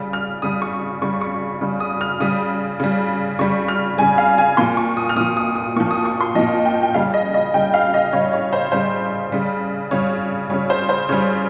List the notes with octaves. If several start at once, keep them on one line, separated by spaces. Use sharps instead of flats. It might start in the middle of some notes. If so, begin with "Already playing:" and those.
Already playing: C#3 G3
F6
C#3 G3 D#6
C#6
C#3 G3 C#6
C#6
C#3 G3
D#6
F6
C#3 G3 D#6
C#3 G3
C#3 G3 C#6
F6
C#3 G3 G#5
F5
G#5
A#2 F3 C6
C#6
D#6
F6
A#2 F3 D#6
D#6
D#6
A#2 F3 C#6
D#6
C#6
C6
A#2 F3 D#5
G5
G5
C#3 G3 F5
D#5
D#5
C#3 G3 G5
F5
D#5
C#3 G3 C#5
C#5
C5
C#3 G3 C5
C#3 G3
C#3 G3 C#5
C#3 G3 C#5
C5
C5
C#3 G3 C#5